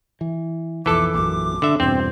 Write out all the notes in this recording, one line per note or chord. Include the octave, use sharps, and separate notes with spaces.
E3
B1 F2 E3 A4 D6
A#1 F#2 D6
D3 E5
E2 G2 B2 C4 C5